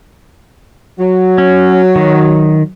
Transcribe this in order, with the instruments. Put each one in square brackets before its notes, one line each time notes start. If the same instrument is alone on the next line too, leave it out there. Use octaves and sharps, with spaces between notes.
[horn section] F#3
[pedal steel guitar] C#4
D#3